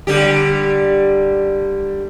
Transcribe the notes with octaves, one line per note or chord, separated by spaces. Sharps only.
D3 G3 G4